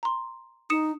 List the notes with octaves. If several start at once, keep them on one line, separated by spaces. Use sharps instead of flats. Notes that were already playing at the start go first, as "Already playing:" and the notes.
A#5 C6
D#4 D#6 C#7 E7